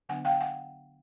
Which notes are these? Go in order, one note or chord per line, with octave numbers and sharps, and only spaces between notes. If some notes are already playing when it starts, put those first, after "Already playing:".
D3 F#3 B3 D4 F#5 G#5
F5 G5
F#5 G#5